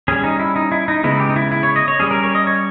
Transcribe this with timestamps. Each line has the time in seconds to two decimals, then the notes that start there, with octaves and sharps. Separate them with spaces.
0.08 G3 C#4 G#4
0.24 D#4
0.39 E4
0.56 D#4
0.71 E4
0.88 D#4
1.03 C#3 G#3 B3 E4
1.20 G4
1.30 D#4
1.36 E4
1.52 E4
1.63 C#5
1.76 D#5
1.88 C#5
1.99 G3 C#4 G#4
2.11 A#4
2.23 C#5
2.35 D#5
2.47 C#5